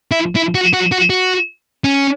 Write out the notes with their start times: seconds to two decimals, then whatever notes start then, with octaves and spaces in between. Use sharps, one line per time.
0.11 E4
0.36 E4
0.55 F#4
0.73 F#4
0.92 F#4
1.10 F#4
1.84 C#4